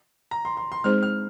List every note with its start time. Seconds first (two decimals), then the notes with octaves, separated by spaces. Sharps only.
0.31 A#5
0.45 C6
0.57 C6
0.72 C6
0.84 G#3 C4 D#4 G#4 C5 F6
1.03 F6